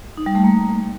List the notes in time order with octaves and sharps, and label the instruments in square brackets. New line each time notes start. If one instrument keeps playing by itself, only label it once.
[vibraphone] D#4
G3
A3
A#3